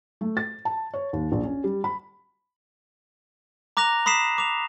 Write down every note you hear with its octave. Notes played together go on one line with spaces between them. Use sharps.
A3
A6
A5
C#5
D#2
A#1
C#4
G3
B5
A#5 D6 F#6 A#6 F7
B5 D#6 B6 C7 E7
D6 F7